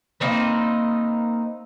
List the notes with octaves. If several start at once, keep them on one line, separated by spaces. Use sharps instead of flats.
A#3 C4 D#4 B4